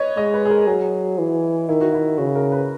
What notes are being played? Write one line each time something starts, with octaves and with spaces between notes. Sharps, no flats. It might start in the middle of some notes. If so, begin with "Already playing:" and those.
Already playing: B4 C#5 D#5
G#3 D#5
B4
G#4
A#4
F#3 G#4
E3
D#3 E4
F#4
E4
C#3 F#4
A#4
B4